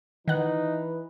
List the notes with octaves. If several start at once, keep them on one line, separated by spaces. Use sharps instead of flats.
D#3 E3 D#4 B4 F#5